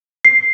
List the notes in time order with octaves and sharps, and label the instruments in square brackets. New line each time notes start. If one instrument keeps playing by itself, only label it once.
[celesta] C7